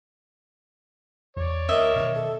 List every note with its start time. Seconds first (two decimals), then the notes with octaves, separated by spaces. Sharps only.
1.36 E2 C#5 D5
1.69 D2 A#4 D#5 E5
1.96 B2 D#3 E3
2.15 A4